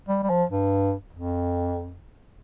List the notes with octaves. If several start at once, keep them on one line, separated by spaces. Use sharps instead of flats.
G3
G3
F3
G2
F2